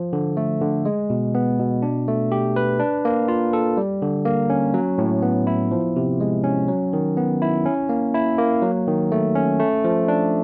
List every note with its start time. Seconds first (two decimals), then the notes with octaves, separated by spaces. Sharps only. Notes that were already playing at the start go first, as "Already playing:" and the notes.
Already playing: F3
0.13 D3
0.37 A3
0.61 D3
0.85 G#3
1.10 B2
1.35 B3
1.59 B2
1.82 D4
2.08 A3
2.32 G4
2.56 B4
2.79 D4
3.05 A#3
3.28 F4
3.53 A4
3.77 G3
4.02 D3
4.25 A#3
4.50 C#4
4.74 F#3
4.98 A2
5.22 B3
5.47 E4
5.71 F3
5.96 C3
6.20 G#3
6.44 C#4
6.68 F#3
6.93 D#3
7.17 B3
7.42 E4
7.66 C#4
7.89 A#3
8.14 E4
8.38 A#3
8.62 F#3
8.87 D#3
9.12 A3
9.35 C#4
9.60 A3
9.84 F3
10.08 D4